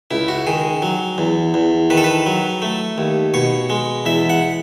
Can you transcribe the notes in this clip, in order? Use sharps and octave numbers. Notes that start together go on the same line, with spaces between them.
C#2 E4
F#4
D#3 G#4
F#3
E2
E2
D#3 B4
A4
B4
F#3
A3
D#2
B2 C#5
G#3
E2 E5
F#5